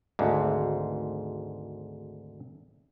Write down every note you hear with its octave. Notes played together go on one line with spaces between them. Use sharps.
G#1 D2 G#2